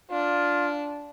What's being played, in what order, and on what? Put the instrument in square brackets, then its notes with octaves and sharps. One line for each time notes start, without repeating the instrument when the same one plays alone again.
[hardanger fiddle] D4 [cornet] F4